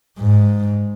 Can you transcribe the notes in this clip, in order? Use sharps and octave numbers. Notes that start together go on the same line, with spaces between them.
G#2